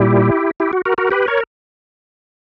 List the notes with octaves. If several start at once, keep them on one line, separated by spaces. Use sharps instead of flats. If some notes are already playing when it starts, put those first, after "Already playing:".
Already playing: A#2 G3 E4 G4
E4 G4
F#4
F#4 A#4
F#4 A#4
G4 B4
A#4 C#5